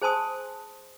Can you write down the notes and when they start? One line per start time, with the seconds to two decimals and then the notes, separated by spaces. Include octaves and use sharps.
0.02 G#4 C5 G#5 A5 C6 D#6